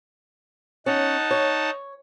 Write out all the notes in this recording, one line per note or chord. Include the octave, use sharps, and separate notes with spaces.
C#4 D#4 F#5 A5
C#5